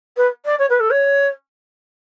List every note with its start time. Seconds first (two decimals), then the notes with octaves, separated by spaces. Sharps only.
0.17 B4
0.45 D5
0.58 C#5
0.69 B4
0.80 A4
0.90 C#5